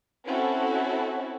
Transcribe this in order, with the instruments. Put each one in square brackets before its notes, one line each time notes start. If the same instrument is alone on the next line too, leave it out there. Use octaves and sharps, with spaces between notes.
[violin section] C4 C#4 E4 F#4 A4